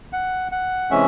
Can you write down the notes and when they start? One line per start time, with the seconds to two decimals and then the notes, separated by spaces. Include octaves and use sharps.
0.13 F#5
0.52 F#5
0.91 C3 E3 G#3 C#4 E5